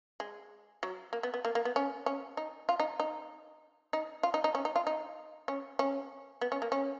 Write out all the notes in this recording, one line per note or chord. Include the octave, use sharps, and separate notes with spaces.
G#3
F#3
A#3
B3
B3
A#3
A#3
B3
C#4
C#4
D#4
F4
D#4
D#4
D#4
F4
D#4
D#4
C#4
D#4
F4
D#4
C#4
C#4
B3
C#4
A#3
C#4